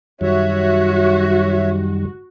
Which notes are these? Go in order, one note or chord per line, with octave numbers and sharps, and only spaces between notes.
F#2 D#3 G3 F#4 C#5 E5